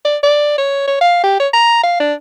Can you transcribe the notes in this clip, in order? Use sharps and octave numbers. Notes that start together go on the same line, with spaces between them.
D5
D5
C#5
C#5
F5
G4
C#5
A#5
F5
D4